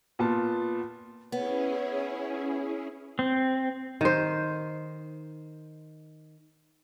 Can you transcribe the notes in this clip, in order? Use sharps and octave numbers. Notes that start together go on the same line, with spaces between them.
A#2 B3 F4 A5
B3 C#4 E4 G#4 C#5
C4
D#3 C5